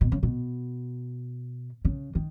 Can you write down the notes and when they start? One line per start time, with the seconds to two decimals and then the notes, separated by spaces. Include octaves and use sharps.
0.01 B2
0.12 C#3
0.23 B2
1.85 C#3
2.15 D#3